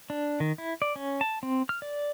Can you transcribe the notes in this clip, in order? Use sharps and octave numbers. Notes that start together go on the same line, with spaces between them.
D4
D#3
E4
D5
C#4
A5
C4
F6
D5